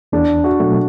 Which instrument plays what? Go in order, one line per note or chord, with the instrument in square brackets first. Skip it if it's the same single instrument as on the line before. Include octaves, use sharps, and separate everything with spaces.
[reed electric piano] E2 [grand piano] D4
[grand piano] F#4
[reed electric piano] B2 F#3 A3